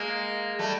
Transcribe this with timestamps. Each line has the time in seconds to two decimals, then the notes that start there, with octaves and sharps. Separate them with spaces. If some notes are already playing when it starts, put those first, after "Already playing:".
Already playing: G#3 A#3
0.59 G3 A3